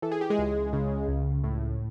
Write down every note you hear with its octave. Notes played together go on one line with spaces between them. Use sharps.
E3 A4
G#4
G4
G#3 G#4
C#2
C#3
C#2
A2